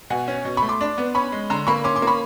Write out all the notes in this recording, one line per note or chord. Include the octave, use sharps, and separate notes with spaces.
B2 F#5 G#5
C#4
B2
A3 B5 C#6
C6 D6
D4
B3
C#4 B5 C#6
G#3
D3 A#5 C6
A#3 B5 C#6
C#4 C6 D6
C6 D6
A#3
B5 C#6